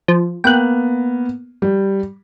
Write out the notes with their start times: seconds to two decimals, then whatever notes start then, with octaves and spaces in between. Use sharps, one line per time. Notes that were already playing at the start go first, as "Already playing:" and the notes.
0.08 F3
0.44 A#3 B3 G5 F#6
1.62 G3